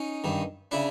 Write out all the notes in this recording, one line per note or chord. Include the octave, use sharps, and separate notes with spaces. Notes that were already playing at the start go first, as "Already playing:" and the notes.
Already playing: C#4 D#4
G2 D#3
C#3 D4 E4